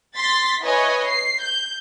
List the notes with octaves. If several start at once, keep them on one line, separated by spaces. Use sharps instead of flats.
C6 A6 B6
E4 B4 C#5 D#5 G#5
C7
G6